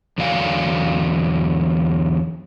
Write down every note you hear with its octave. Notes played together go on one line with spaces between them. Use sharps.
E2 D3 F#3 D5 F5 G#5